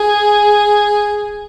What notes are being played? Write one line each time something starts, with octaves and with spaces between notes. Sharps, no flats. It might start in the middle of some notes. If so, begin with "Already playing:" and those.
Already playing: G#4